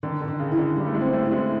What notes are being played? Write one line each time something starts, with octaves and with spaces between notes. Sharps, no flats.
D3 D#3
D3
D#3
C#3
E4
D3
G3
A3
G#3
C4
A3
E4
G#3